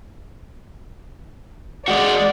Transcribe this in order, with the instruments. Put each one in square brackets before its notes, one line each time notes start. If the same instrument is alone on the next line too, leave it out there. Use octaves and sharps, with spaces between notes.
[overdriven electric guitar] G#3 F#4 [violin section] D5